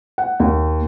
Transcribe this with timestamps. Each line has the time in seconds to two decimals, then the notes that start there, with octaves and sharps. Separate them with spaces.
0.18 F#5
0.40 D#2